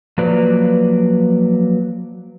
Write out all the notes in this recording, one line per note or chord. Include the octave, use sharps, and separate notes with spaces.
F3 F#3 A#3 B4 D5